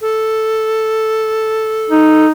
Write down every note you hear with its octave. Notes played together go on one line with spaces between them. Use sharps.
A4
D#4